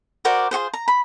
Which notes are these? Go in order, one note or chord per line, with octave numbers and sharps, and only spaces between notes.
F#4 A#4 C5 D5
F4 F#4 G#4 C5
A#5
B5